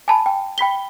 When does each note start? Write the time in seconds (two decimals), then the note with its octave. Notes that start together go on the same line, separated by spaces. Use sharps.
0.08 G#5 A5 B5
0.26 G5
0.58 G5 B5 B6 G7